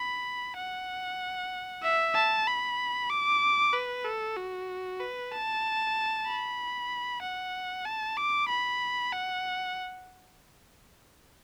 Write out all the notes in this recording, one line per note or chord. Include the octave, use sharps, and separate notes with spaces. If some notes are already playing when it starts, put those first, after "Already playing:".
Already playing: B5
F#5
E5
A5
B5
D6
B4
A4
F#4
B4
A5
B5
F#5
A5
D6
B5
F#5